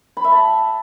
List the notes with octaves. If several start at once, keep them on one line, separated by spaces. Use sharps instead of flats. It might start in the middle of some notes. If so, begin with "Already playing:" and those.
B5
E5
A5